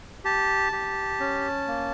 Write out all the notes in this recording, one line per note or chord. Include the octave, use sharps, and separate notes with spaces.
G4 A5
G4
C#4
A#3